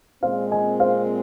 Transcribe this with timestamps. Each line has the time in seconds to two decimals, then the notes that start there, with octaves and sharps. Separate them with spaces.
0.23 A#2 G#3 C4 C5 F5
0.51 D#5 G#5
0.80 C5 F5